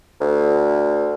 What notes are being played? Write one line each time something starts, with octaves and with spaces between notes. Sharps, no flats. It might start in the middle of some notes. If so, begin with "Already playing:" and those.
D2